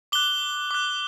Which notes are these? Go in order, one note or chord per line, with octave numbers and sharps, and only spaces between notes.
D6 F#6 G7
D6 F#6